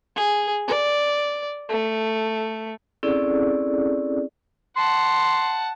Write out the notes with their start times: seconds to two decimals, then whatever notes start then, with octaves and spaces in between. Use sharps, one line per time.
0.16 G#4
0.68 D5
1.69 A3
3.03 C4 C#4 E4 G#4 A4 D5
4.77 F#5 A5 C6